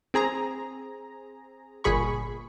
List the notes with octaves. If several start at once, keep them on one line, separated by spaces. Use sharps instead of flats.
C4 G#4 A#5
G1 A#2 G#4 B5 C#6